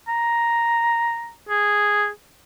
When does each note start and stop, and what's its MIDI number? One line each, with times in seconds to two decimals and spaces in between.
0.08 1.32 82
1.49 2.08 68